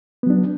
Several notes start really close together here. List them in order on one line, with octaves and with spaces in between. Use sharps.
B3 F#3 D4